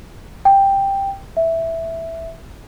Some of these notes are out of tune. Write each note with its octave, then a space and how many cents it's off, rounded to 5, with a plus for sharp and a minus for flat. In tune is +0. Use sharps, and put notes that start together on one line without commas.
G5 +5
E5 -5